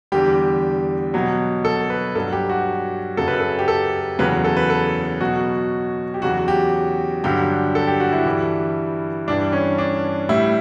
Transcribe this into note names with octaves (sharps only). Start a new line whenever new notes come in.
E2 D3 G3 G4
B2 F#3
A4
B4
G2 F#3 A4
G4
F#4
F#2 C#3 F#3 A4
B4
A4
G4
A4
E2 C#3 F#3 B4
A4
B4
A4
B2 F#3 F#4
G4
E2 C#3 F#3 F#4
G4
G2 D3 F#3 G4
A4
G4
F#4
E4
G2 E3 G3
G2 E3 G3 D4
C#4
D4
A2 G3 E4